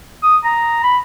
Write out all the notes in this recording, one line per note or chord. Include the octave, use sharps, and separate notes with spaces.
D#6
A#5
B5